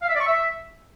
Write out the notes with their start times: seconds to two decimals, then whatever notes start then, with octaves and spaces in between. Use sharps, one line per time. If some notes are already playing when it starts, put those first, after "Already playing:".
0.02 F5
0.08 E5
0.14 D5
0.20 C#6
0.26 E5